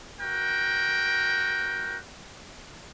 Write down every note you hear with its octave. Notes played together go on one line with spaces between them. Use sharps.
F#4 A#4 G5